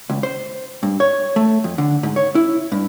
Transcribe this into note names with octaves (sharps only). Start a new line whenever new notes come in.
C#2
C5
G2
C#5
A3
F2
D3
G#2
C#5
E4
G2